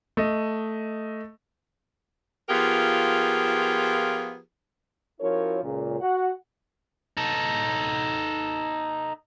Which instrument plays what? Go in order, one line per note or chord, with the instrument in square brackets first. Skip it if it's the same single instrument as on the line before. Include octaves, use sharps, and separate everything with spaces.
[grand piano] A3 D#5
[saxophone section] F3 B3 F4 G4 G#4 A#4
[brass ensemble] F3 C#4 E4 F#4 A#4 C#5
C#2 A#2 C#3
F#4 F#5
[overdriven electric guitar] D#4 A4